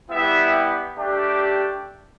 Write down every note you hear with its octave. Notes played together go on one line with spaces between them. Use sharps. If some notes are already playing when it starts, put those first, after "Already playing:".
G3 B3 E4 G4 E5
A3 D4 G4